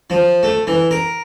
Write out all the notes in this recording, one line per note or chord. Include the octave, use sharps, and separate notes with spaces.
F3
A3
E3
A#4